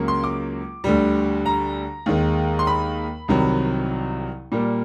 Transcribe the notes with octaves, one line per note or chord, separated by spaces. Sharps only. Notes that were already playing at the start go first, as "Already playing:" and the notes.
Already playing: C#2 C#3 F#3 A#3
C6
D6
D2 D3 G3
A#5
D#2 D#3 G#3
C6
B5
C2 C3 D#3 F#3
A#2 G3 A#3